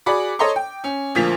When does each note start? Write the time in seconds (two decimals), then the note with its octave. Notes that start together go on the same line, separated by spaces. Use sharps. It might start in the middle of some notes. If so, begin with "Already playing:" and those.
0.06 F#4 G#4 D5 B5 D6
0.39 A4 C#5 D#5 A#5 C6 C#6
0.56 G5
0.84 C#4
1.15 D2 A#2 F3 B6 F7